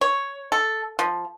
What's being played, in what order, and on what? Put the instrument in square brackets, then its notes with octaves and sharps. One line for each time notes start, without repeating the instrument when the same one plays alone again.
[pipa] C#5
A4
F3